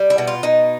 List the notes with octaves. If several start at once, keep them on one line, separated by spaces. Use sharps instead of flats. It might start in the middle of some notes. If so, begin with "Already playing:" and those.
Already playing: G3
E4
B2
F4
B2 D#4